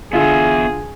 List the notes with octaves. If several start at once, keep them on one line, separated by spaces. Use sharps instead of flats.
D3 B3 F4 G#4 E5